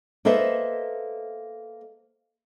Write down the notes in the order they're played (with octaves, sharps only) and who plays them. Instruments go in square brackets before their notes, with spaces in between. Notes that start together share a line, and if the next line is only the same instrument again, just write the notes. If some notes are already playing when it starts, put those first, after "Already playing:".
[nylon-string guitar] A#3 A4 B4 C5 D#5 E5